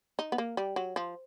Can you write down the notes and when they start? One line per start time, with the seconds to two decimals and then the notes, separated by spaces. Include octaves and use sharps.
0.19 D#4
0.32 B3
0.38 A#3
0.57 G3
0.76 F#3
0.96 F3